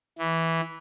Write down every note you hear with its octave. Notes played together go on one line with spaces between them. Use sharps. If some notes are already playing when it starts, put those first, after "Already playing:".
E3